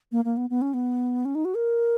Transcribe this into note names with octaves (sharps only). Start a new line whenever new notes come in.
A#3
A#3
B3
B3
C#4
B3
C#4
D#4
F#4
A#4